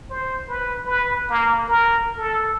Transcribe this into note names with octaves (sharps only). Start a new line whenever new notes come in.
C5
B4
B4
A#3
A#4
A4